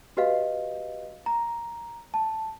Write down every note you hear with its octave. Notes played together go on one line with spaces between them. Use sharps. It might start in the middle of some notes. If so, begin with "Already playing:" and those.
F#4 G4 B4 D#5 F5
A#5
A5